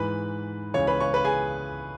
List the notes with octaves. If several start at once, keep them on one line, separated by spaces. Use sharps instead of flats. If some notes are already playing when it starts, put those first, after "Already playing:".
Already playing: G#2 E3 B4 B5
C#2 C#3 E3 C#5 C#6
B4 B5
C#5 C#6
B4 B5
G#4 G#5